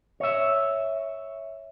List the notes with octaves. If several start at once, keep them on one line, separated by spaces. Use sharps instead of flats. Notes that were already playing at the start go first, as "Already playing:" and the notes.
C#5 E5